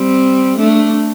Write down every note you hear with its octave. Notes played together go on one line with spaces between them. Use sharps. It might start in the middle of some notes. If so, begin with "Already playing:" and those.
Already playing: G3 C4
A3 D4